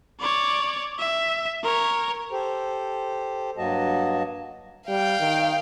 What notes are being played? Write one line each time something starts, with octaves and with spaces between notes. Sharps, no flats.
C#5 D5
E5
A#4 C#5
G4 A4 C5
G2 F#3 A#3 F#4 D#5 A5
G3 F5 G5
D#3